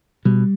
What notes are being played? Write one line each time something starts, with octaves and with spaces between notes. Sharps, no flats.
B2 G3